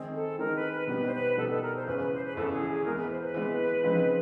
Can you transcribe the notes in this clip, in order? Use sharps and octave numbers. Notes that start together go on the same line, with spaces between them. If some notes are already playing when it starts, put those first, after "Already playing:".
Already playing: D#3 G#3 C4 D#4 G#4
A4
D#3 G#3 C4 D#4 G#4 A#4
B4
B4
B2 G3 B3 D#4 B4
C5
B4
B2 G3 B3 D#4 A4
A4
A#4
C5
E2 C#3 E3 B4
B4
C5
B4
E2 C#3 E3 A4
G#4
G#4
E3 G#3 B3 A#4
B4
C5
B4
E3 G#3 B3
C#3 F3 G#3 C4 D#4